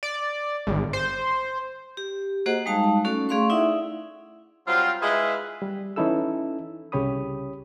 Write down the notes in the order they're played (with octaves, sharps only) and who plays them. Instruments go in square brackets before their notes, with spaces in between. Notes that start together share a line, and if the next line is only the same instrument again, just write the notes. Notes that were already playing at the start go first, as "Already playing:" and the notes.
[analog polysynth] D5
G#1
C5
[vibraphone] G4
A#3 F#4 G#4 C5 D#5 F#5
G3 G#3 D#4 F5 A5
A3 C#4 F#4 A4 D5
A3 G#4 D5 F5 C6 C#6
D#4 E4 D5 E5 F#5
[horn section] F#3 G3 C4 F4
G#3 E4 F4 G#4 B4 E5
[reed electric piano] G3
E3 C#4 D#4 E4 A4 E6
C2 C#3 G4 C#5 B5 D#6